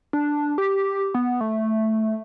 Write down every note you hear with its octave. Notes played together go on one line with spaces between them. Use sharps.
D4
G4
B3
A3